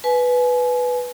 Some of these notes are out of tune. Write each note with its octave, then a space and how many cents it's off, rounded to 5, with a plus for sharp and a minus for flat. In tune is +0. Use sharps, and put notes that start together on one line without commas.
B4 +0 G#5 +30